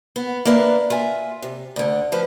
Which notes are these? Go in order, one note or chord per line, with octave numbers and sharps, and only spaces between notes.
B3
A#3 D4 E4 B4 F5
F4 E5 G#5
C3
D2 D3
F3 B4 C5